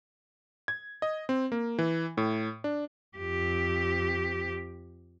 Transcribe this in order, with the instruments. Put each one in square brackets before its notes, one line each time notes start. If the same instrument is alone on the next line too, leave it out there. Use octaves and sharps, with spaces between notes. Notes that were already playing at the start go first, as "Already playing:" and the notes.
[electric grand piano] G#6
D#5
C4
A#3
E3
A2
D4
[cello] F2 G4